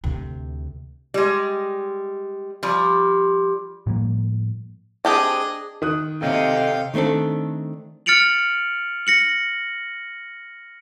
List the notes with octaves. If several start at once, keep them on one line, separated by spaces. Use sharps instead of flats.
D2 C3
G3 G#3
F3 G3
A2 F3 G3 A#3
C4 D4 G4 G#4 D#5 A5
D#3 D#6 F#6
C3 A4 C#5 D#5 F5 G5
D#3 A3 C4 D4 A4
F6 A6 C#7 D7 F7 F#7
A#6 C#7 F#7